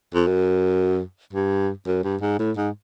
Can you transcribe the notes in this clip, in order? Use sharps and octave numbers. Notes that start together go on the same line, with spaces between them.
F2
F#2
G2
F#2
G2
G#2
A2
G#2